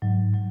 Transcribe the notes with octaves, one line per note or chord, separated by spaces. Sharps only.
G#2 F#3
F#3